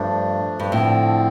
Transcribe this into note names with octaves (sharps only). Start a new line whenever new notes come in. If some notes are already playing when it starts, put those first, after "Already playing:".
Already playing: G2 F3 A3 D4
G2
A2 D3 F3 C4